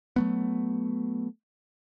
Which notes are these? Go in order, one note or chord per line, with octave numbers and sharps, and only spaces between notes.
F#3 A3 B3